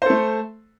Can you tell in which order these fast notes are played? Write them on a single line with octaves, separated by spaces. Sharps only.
C5 A4 A3